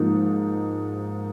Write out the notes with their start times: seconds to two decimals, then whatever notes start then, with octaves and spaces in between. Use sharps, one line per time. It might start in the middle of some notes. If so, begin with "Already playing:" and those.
Already playing: G#2 F3 A#3 D#4